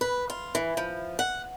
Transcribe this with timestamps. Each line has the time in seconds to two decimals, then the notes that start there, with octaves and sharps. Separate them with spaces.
0.01 B4
0.30 F4
0.55 E3
0.77 F3
1.19 F#5